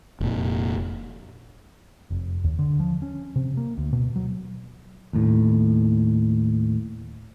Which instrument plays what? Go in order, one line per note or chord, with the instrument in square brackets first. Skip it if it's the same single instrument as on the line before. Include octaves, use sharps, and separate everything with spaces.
[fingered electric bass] F1 A#2
[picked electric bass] F1
D#2
D3
F3
C#4
C3
A#3
D2
B2
F#3
D#2 A2